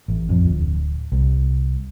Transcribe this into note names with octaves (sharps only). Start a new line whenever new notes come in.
A1
F2
D1
C2